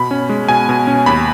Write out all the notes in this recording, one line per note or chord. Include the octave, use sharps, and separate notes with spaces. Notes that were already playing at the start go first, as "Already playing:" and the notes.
Already playing: B2 B5
C#4
G#3
B2 G#5
B2
C#4
D#2 B5